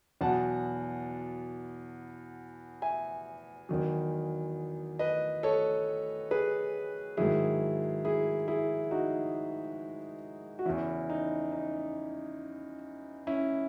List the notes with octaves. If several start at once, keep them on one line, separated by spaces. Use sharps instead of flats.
E2 B2 F#3 F#5 A5
E5 G#5
E2 D#3 F#3
B4 D#5
A4 C#5
G#4 B4
G#2 D#3 F#3 E4 G#4
E4 G#4
E4 G#4
D#4 F#4
F#4
E2 C#3 E3 C#4 E4
D#4
D#4
C#4 E4